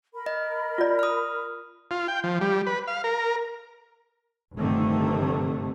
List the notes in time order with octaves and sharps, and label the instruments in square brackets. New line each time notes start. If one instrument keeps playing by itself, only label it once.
[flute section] A#4 B5
[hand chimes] D#5
[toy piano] F4 D5
[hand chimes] D#6 F6
[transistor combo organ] F4
G5
F3
G3
B4
F5
A#4
[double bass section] F1 G2 D3 D#3 A3 C4